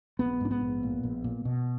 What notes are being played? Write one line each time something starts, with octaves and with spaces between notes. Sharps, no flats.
A#1 B3
G#2 D4
B3
A#1
A#2
A#1
A#2
B2